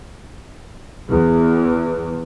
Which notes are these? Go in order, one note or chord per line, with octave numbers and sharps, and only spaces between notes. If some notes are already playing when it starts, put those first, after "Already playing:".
E2